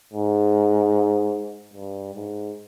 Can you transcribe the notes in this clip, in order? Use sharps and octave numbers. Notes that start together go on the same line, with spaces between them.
G#2
G2
G#2